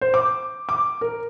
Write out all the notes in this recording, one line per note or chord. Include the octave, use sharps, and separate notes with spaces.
C5
D6
D6
A#4